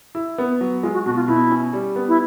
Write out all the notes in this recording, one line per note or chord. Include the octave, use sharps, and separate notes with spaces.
E4
B3
F#3
G#3 F4
F#4
B2 F#4
F4
B2 E4
C#4
G3
B3
E4